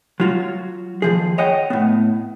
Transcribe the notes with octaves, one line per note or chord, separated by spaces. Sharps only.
F#3 F4 F#4
D#2 F3 G#4
C#5 D#5 F#5 G5
A2 B3